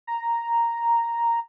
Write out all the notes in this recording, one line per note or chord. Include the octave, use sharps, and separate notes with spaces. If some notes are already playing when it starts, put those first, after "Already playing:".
A#5